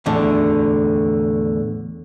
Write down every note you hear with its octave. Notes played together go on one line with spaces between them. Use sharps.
E2 A2 D3